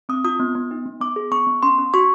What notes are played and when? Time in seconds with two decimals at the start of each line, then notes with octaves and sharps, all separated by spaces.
0.09 C4 D#6
0.25 F4 D#6
0.39 B3
0.55 B3
0.71 D#4
0.86 B3
1.00 B3 D6
1.16 G#4
1.31 B3 C#6
1.47 B3
1.63 C#4 C6
1.78 C#4
1.94 F#4 C#6